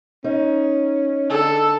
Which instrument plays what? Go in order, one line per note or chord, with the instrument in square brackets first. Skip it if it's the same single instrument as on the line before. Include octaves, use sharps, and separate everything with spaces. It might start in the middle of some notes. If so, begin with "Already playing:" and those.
[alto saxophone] C#4 [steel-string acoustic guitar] D#4
[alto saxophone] D3 [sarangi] A4